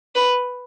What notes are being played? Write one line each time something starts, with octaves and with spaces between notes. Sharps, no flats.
B4